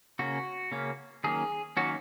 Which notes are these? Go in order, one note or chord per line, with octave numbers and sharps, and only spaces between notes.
C#3 A#3 C#4 F#4
C#3 A#3 C#4
D#3 F#3 A#3 C#4 G#4
D#3 F#3 A#3 C#4 F#4